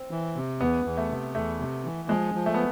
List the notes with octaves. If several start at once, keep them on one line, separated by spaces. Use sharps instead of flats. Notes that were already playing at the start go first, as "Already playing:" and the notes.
Already playing: C4
E3
C3
E2 B3
E2
A3
C3
E2 A3
C3
E3
F3 G#3
F3
A3
B3